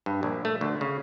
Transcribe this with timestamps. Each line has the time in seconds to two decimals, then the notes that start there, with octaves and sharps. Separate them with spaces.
0.06 G2
0.23 A#1
0.45 A3
0.61 D2
0.81 C#3